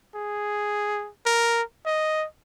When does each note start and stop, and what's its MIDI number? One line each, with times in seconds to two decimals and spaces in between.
0.15 1.09 68
1.26 1.62 70
1.86 2.26 75